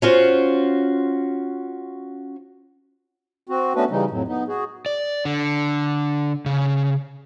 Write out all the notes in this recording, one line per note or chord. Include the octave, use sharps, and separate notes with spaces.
C#4 F4 F#4 C5
C4 F#4
A3 B3 C#4 D4 F#4 B4
C#3 E3 G3 D#4
F2 A2 F#3
B3 D#4
F#4 G#4
D5
D3
C#3